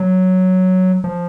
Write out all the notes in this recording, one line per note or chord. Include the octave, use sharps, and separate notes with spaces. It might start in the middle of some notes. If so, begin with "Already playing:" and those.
Already playing: F#3
F3